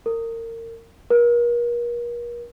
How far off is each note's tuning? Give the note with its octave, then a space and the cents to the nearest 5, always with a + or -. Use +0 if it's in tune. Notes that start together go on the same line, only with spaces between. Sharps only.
A#4 -30
A#4 +40